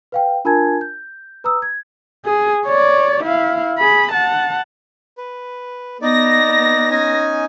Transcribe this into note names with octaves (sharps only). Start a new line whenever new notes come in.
B4 F5 G5
D4 F4 A#4 G#5 A5 G#6
G6
B4 A#5 D#6 E6
G#6
G#4
C#5 D5
E4 F5
G#4 B5
F#5 A5
B4
B3 D#4 D5 A#6
C#4 D#4 G#5